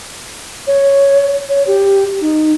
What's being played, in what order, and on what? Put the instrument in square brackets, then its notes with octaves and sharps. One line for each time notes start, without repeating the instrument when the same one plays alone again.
[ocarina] C#5
C#5
G4
D#4